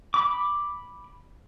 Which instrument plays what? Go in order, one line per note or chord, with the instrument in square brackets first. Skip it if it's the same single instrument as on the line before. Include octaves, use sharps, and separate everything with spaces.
[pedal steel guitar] B5 D6